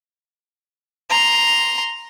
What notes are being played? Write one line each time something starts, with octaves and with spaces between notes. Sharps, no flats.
A#5 C6